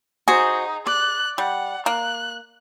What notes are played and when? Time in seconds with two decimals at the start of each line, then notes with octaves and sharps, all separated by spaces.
0.28 D#4 F#4 G#4 C5
0.87 D5 F#6
1.38 G3 F#5
1.86 A#3 F#6